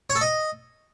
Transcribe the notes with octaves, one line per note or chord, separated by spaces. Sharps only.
C#5
A4
D#5